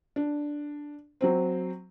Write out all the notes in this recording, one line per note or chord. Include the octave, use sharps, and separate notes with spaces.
D4
F#3 C4 C5